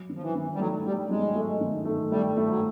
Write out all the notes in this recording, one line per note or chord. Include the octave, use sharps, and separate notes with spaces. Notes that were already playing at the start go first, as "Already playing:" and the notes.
Already playing: F#3
D#3
F3
E3
D#3
G3
F#3 A3
D#3 G3
F#3 G#3
A3
D#3
A3
G3 A3
A3
F3
F#3